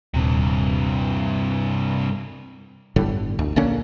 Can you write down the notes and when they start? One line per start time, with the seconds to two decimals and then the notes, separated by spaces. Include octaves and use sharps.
0.14 D#1 G2 C3
2.96 G1 A2 D3 G3
3.39 D2
3.56 A#1 D3 A#3 C#4